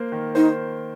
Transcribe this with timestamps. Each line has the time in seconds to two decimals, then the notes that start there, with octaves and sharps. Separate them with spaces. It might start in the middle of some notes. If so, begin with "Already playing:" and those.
Already playing: A#3 C5
0.12 D#3
0.35 D#4 C5